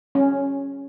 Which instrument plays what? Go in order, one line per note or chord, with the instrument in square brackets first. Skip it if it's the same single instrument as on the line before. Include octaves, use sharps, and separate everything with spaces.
[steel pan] C#4